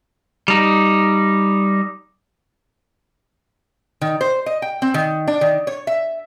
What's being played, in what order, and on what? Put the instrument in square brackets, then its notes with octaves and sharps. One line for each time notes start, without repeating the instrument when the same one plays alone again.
[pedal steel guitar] G3 D#4
[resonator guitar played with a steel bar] D#3
C5
D#5
G5
C4
D#3
D4
D#3
C#5
E5